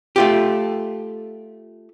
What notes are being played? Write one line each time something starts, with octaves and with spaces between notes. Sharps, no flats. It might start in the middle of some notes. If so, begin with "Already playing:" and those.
A3 F4 G4